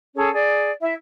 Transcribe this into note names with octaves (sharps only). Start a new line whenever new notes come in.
C#4 G#4 A4 C#5
G#4 D5
E4 E5